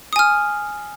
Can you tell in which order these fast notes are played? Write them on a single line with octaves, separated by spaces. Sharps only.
D#6 G#5 F6